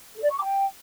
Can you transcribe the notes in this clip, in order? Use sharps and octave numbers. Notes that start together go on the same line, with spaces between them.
A4
D5
C#6
D6
G5